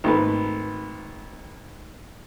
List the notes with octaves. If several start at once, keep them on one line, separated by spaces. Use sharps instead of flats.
G#1 A3 B4